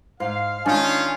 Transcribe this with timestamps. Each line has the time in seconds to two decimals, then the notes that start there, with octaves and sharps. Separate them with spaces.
0.20 G#2 F5
0.66 D#3 G#3 C#4 D4 F4 G#5